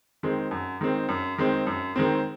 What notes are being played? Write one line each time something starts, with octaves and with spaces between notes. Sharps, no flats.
D#3 G#3 C4
F#2
D#3 G#3 C4
F#2
D#3 G#3 C4
F#2
D#3 G#3 C4